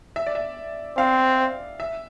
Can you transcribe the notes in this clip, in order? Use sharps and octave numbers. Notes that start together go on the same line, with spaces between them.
E5
D5
E5
C4 F5
E5